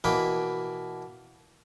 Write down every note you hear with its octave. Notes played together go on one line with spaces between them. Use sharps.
B2 E3 A#3 B4 G5